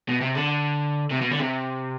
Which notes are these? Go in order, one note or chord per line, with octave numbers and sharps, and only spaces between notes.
B2
C3
D3
C3
B2
D3
C3